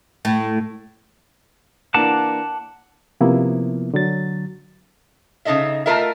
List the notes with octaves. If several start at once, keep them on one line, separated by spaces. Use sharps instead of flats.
A2
E3 A#3 D4 F#5 A5 D6
C3 F3 A#3 B3 E4
D3 F#3 A6
C#3 D#4 A4 D#5 E5
A3 F4 A4 A#4 D#5 E5